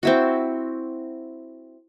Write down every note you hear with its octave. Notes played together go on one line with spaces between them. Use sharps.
C4 E4 F#4